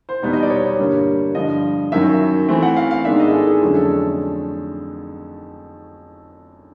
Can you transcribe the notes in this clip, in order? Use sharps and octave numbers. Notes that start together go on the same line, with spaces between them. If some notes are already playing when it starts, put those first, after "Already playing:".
C5
E2 B2 G3 B3 D#4
D#5
D5
C#5
C#5
G2 D3 G3 A#3
G2 D3 F3 D#5
F#2 D#3 F#3 E5
E3 A3 C4
F#5
F5
F5
G#2 D#3 G#3 B3 D4 E5
D#5
G#4
A4
G#4
F2 D3 F#3 A3 C#4 G#4
A4